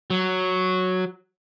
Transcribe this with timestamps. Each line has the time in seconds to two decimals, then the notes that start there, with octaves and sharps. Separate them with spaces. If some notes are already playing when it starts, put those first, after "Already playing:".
0.10 F#3